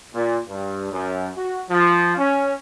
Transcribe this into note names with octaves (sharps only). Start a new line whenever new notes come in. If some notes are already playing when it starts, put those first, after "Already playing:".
A#2
G2
F#2
F#4
F3
C#4